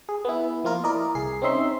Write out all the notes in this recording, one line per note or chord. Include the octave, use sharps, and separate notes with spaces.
G#4
B3 E4
F3 A#3 F4 A#4
E4 A#4 D5 D#5
C2 G#4 C7
C4 C#4 D#4 E5 C6